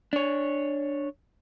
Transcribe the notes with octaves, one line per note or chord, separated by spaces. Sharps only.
D4 C#5